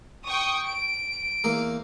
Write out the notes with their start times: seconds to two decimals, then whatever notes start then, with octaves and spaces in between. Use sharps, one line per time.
0.24 G5 C#6 D#6
0.66 D7
1.44 E2 A#3 A#4